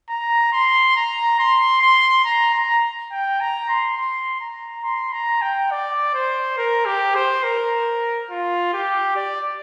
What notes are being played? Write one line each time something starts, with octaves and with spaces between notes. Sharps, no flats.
A#5
C6
A#5
C6
C6
A#5
A#5
G5
A#5
C6
C6
A#5
C6
A#5
G5
D5
C5
A#4
G4
C5
A#4
F4
G4
D5